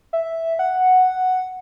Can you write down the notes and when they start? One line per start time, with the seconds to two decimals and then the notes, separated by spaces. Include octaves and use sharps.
0.13 E5
0.59 F#5